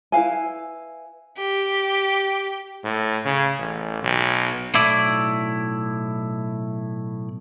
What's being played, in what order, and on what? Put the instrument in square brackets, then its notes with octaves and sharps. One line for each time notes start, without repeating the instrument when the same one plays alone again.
[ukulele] E4 B4 F5 G#5
[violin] G4
[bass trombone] A2
C#3
A1
B1
[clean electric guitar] B1 A2 E4 D5